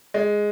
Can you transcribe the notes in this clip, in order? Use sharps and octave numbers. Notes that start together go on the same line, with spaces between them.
G#3